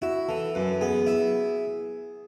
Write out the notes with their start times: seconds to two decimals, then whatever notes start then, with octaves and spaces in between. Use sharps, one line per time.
0.02 E4 F#4
0.28 E3 A4
0.55 F#2 B4
0.81 B3 G#4
1.07 E4